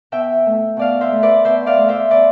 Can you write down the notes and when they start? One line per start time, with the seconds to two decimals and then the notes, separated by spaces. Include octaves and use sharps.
0.12 B2 E5 G5
0.46 A3
0.77 B2 D5 F5
1.01 C5 E5
1.12 A3
1.23 B4 D5
1.44 B2 C5 E5
1.66 D5 F5
1.77 A3
1.89 C5 E5
2.11 B2 B4 D5